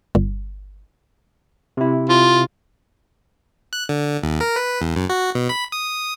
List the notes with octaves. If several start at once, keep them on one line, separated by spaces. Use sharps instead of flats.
G1
C3 E4
F4
F#6
D3
D#2
A#4
B4
E2
F#2
F#4
B2
B5
D#6